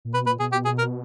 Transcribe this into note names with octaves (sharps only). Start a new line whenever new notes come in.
A#2
B2 B4
A#2 B4
B2 G#4
G4
G#4
A#4